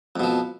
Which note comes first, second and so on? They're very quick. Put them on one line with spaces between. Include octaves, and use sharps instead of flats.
F2 B2 F3